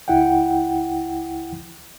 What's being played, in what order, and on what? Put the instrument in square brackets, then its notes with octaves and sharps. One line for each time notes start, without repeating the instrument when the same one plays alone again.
[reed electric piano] C#2 E4 F#5 G5